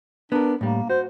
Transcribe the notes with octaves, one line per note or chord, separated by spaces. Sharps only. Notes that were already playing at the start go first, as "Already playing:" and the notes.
B3 D4 A#4
A2 G3 A#3
F#4 C5